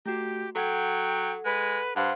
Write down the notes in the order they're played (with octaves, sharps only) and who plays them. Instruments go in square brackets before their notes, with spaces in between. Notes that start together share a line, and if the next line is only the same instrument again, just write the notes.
[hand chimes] A3 F#4 [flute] G4
[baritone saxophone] F#3 [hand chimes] A4 F#5 G#6 [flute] G5
[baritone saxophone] G#3 [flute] B4
[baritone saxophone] G2 [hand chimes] C5 F5 F#5 [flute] C6